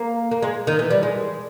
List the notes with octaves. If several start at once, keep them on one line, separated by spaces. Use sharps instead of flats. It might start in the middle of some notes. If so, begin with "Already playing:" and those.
Already playing: A#3
A#3
G#3
D#3
E3
G3
G#3